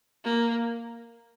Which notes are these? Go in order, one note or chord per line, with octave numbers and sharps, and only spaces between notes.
A#3